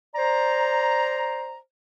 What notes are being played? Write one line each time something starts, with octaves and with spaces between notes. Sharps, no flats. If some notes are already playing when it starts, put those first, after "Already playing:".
C5 D5 A#5